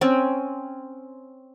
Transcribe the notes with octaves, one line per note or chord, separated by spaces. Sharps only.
C4 C#4